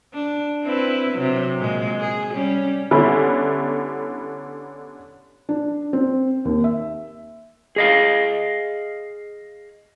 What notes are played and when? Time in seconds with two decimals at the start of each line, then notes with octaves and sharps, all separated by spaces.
0.13 D4
0.64 C4 E4 B4
1.13 C3 F#3
1.58 A#2 G#3
2.01 G#4
2.33 G3 C#4
2.91 D3 G3 B3 C#4 E4
5.49 D4
5.93 C4
6.45 D#2
6.64 E5
7.76 G#4 D#5 F5